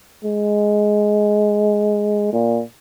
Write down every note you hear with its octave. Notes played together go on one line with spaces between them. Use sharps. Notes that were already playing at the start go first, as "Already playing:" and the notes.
G#3
A#2